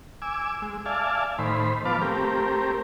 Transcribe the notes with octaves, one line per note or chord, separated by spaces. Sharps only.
G#5 D6 E6
G#3
D5 E5 F5 G#5 A5
A2 D#3 C5 B5
F3 B3 B4 F5 A5 D6
A3 C4 G4 A#4